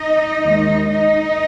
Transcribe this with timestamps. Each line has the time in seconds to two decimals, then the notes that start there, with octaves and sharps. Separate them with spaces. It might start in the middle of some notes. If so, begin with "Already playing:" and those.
Already playing: D#4 D#5
0.42 D#2 D#3 G#3
0.90 D#4 D#5